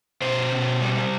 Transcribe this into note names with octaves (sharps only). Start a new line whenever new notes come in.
B2 C5
B2
G3